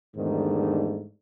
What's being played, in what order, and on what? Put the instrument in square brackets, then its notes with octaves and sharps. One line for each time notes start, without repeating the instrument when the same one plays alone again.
[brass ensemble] E2 G#2 D#3 G3 A3 D4